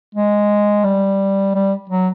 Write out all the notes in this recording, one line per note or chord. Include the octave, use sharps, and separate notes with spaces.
G#3
G3
G3
F#3